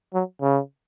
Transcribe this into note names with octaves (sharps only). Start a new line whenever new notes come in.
F#3
C#3